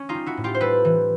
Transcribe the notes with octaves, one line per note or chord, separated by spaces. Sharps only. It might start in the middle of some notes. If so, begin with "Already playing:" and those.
Already playing: C#4
D#4 F4
G3
E4 F#4
A2
F4 G4
C5
G3 A4 B4
E3